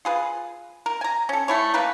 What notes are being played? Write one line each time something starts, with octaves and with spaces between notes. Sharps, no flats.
F4 G#4 B4
A#4
G#5 A#5
C#4 A4
A3 E4 C#5
E3 A#3 A#4 B4